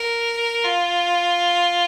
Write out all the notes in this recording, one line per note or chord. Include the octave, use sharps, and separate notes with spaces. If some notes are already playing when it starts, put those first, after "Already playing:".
Already playing: A#4
F4